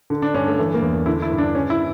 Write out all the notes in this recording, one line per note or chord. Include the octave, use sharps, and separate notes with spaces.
D3
D4
G2 C#4
A3
E3 A3
A#3
E2
D3 E4
E4
G2
D4
C#3 C#4
E4